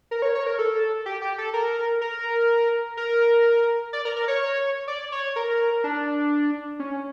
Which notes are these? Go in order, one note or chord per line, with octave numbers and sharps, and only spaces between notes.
A#4
C#5
C#5
A#4
A4
G4
G4
A4
A#4
A#4
A#4
D5
A#4
A#4
C#5
D5
C#5
A#4
D4
C#4